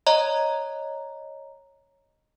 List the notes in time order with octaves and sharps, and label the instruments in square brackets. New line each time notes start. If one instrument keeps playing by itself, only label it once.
[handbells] C#5 D#5 A#5